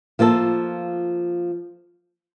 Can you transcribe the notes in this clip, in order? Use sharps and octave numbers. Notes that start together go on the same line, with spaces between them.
F3 A#3 F4 A4